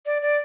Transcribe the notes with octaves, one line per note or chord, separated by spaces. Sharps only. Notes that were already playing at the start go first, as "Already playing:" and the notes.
D5
D5